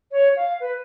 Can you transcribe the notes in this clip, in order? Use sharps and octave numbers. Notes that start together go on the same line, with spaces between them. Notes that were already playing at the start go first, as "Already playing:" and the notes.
C#5
F5
B4